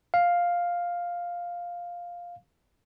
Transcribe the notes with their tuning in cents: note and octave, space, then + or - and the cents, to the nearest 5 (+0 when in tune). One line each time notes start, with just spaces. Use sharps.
F5 +5